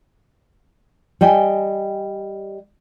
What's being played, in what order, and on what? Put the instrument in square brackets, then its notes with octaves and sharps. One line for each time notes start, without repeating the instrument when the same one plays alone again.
[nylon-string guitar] G3 D#5 G5 G#5